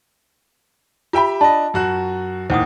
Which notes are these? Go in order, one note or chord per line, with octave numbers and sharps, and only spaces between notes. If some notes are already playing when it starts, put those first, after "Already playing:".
F4 G4 E5 G5 B5
D4 D#5 A5
F#2 F#4 F#6
D#2 A2 C5 F#5 D#6